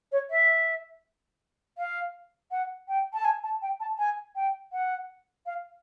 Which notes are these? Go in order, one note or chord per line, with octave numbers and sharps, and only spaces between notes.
C#5
E5
F5
F#5
G5
A5
G#5
A5
G5
A5
G#5
G5
F#5
F5